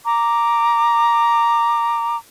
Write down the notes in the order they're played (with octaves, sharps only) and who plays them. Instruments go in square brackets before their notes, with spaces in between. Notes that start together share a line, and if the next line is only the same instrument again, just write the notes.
[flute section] A#5 D6